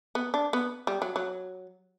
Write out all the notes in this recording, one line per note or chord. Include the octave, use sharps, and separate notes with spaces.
B3
D4
B3
G3
F#3
F#3